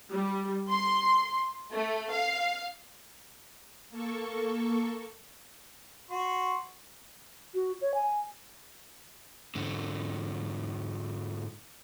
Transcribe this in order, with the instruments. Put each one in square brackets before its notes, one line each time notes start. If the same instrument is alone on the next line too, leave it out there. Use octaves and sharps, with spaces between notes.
[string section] G3
C6
A3
F5
[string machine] A#3 A4 C#6
[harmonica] F#4 C6 C#6
[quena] F#4
C#5
G#5
[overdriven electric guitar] G#2 D3